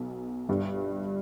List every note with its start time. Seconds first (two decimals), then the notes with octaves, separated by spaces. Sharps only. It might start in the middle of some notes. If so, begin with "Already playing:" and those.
Already playing: B1 B2
0.49 G1 G2 G3 D4